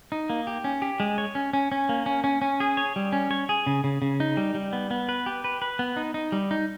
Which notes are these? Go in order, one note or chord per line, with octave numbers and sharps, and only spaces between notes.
D#4
A#3
G4
C#4
G4
G#3
C#5
C#4
C#4
C#4
A#3
C#4
C#4
C#4
G#4
C#5
G3
C#4
C#5
G#4
C#3
C#3
C#3
D#4
G3
G3
B3
B3
B4
G4
B4
B4
B3
D#4
D#4
G3
D#4